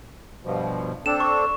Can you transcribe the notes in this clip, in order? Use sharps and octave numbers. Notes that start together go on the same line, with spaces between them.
G2 B2 F3
C4 D4 A4 E7
C#6